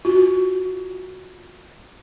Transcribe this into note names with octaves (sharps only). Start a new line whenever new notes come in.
F4 F#4